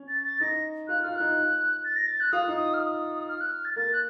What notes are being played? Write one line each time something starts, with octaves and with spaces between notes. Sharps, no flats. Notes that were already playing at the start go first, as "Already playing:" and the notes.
Already playing: C#4
A6
A6
D#4 A#6
F4 F#6
F4 F6
F#6
D#4
A6
A#6
A6
F#6
F4 D#6
D#4
D#6
F6
D#6
F6
F#6
F6
A6
A#3 A6
F#6